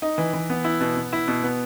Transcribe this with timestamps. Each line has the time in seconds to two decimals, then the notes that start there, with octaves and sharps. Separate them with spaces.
0.02 D#4
0.18 E3
0.34 E3
0.50 B3
0.64 E4
0.81 B2
0.97 B3
1.13 E4
1.28 B2
1.43 B3